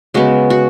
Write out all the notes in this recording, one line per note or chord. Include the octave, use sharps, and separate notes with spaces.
C#3 G#3 B3 F#4
F#4